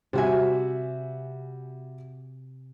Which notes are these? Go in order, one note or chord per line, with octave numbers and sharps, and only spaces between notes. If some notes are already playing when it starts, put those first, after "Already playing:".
C3 G3 F#4 E5 G#5